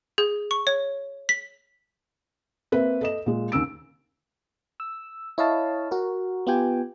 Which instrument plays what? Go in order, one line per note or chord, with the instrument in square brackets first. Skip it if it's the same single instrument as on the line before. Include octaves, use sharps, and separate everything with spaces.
[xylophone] G#4
C#6
C#5
B6
[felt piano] A#3 C4 B4 E5
A4 D#5 E7
A#2 G#3
D#2 C#4 E6 D7
[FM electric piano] E6
E4 C#5 D#5 F5 A5
F#4 A#4
B3 F4 G4 G5 G#5